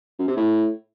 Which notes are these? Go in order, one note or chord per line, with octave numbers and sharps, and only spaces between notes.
F#2
C3
A2